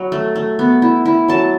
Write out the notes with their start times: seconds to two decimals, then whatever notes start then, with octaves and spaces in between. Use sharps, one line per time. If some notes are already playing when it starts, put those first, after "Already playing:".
Already playing: F#3 B5
0.12 A3
0.35 A3
0.59 B3
0.82 E4
1.06 E4
1.28 F#3 A5